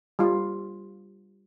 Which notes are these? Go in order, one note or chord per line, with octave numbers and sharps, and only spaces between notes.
G3 F4